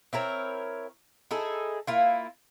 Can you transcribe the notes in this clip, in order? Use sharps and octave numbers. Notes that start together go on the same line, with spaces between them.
C4 E4 A#4 C#5
D#4 E4 G#4 A4
A#3 E4 F4